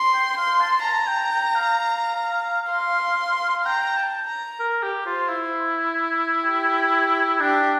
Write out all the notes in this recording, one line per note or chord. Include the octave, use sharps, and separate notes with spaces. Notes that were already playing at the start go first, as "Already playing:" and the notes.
Already playing: C6
G5
F5 C6
A5
A5 A#5
G5
G5
F5
C6
G5 A#5
A5
A#5
A#4
G4
F4 C5
E4
G4
D4 G4